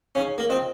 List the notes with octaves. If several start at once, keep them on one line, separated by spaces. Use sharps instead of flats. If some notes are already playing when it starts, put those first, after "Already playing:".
C#4 D#4 G#4 C#5 F5
A#3
C4 F4 C5 D#5